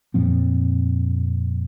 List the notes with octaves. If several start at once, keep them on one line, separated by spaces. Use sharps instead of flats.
F2 A#2 F3 C4